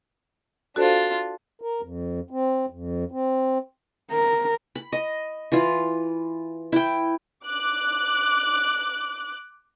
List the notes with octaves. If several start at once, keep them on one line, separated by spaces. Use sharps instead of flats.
D4 F4 F#4 A4 C5
A#4
F2
C4
F2
C4
A#4
B5
D#5
E3 F4
E4 G5
D6 F#6